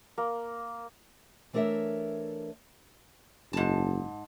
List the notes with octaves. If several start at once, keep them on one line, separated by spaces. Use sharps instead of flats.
A#3
E3 A3 D4 A#4 C#5 E5
F#1 G#2 A5